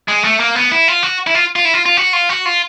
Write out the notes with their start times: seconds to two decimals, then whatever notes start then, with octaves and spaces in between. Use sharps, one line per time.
0.08 G#3
0.24 A3
0.40 A#3
0.55 B3
0.72 E4
0.88 F4
1.03 F#4
1.27 E4
1.35 F4
1.56 F4
1.65 E4
1.74 F4
1.86 F4
1.97 F#4
2.13 F4
2.29 F#4
2.45 F4